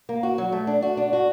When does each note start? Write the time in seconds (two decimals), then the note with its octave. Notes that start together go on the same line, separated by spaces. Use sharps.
0.09 A#3
0.23 F#4
0.38 F#3
0.52 A3
0.67 D4
0.82 F#4
0.97 D4
1.13 F#4